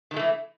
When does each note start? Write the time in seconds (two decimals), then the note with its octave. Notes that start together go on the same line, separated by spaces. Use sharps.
0.11 D#3
0.14 G#3
0.16 A3
0.19 E3